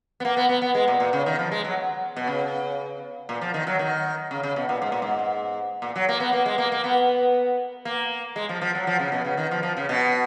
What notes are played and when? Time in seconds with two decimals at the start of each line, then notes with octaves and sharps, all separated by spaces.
0.20 B3
0.25 A#3
0.37 B3
0.49 B3
0.62 B3
0.75 G#3
0.88 A#2
1.00 A#2
1.13 C#3
1.26 D#3
1.39 F3
1.52 G#3
1.64 F#3
2.16 B2
2.27 C#3
3.29 A#2
3.41 F3
3.54 D#3
3.67 F#3
3.79 D#3
4.31 C#3
4.43 C#3
4.56 B2
4.69 A#2
4.82 G#2
4.92 A#2
5.02 G#2
5.82 A#2
5.96 F#3
6.09 A#3
6.20 B3
6.33 A#3
6.46 G#3
6.58 A#3
6.72 A#3
6.84 B3
7.85 A#3
8.36 G#3
8.49 F3
8.61 F3
8.75 F#3
8.87 F3
8.99 C#3
9.12 B2
9.25 C#3
9.37 D#3
9.51 F3
9.63 F3
9.77 C#3
9.89 B2